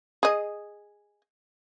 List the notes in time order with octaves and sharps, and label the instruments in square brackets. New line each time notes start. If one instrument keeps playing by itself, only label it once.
[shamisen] G#4 D#5